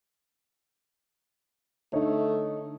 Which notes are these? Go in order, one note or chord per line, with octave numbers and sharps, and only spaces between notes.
D3 A3 D#4 C#5